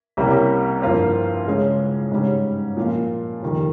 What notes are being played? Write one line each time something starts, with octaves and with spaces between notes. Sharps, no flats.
C2 C3 G3 A#3 C#4
G2 F3 A#3 F4 C5
C#3 G#3 C#4
G#2 G3 C#4
A#2 F3 A#3 F4
F2 D#3 G3